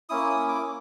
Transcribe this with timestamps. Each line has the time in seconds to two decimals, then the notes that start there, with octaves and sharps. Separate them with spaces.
0.09 A#3 C#4 E4 D#6
0.30 D#6
0.48 D6